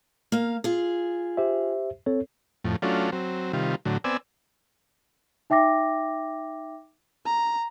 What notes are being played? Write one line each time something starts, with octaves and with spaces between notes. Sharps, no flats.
A#3 F5
F4 G#4
G4 C5 E5
C4 A4 C#5
F2 A2
F#3 A3 C#4 D4 F4
F#3 C4
C3 D#3 G3 F4
A2 D3 F#3
B3 C4 D5 G#5 E6
D#4 E5 G5 D6 A#6
A#5